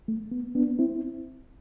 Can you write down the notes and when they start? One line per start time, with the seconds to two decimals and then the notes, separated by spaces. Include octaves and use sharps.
0.08 A3
0.31 B3
0.55 B3 D4
0.79 C4 E4